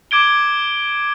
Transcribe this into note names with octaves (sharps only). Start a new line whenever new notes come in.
D6 G#6 D7 G7